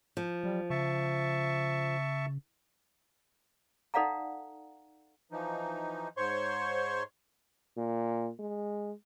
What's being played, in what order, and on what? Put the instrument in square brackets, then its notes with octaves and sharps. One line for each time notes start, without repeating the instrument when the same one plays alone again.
[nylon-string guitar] F3
[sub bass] F#3 [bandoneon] G3
[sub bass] C#3 [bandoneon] E5 A5 C#6
[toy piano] D#4 A4 D5 F5 F#5 A#5
[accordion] E3 F3 D#4
G#2 C5 C#5 C6 C#6
[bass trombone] A#2
G#3